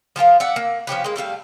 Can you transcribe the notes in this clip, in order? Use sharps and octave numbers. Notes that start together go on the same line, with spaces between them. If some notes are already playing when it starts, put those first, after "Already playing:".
F3 F4 A4 A#4
D5 E5 F#5
A#3
F3 C#4 G4 B4
G#3 A#3
G3 A3 A#4 F5